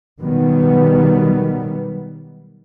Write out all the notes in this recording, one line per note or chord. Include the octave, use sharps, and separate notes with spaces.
B2 D#3 F#3 G3 B3